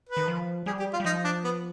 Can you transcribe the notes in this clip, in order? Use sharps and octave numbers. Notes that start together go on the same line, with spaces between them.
B4
D#3
F3
G3 G#4
G4
F4
G3
F3 D#4
D4
B3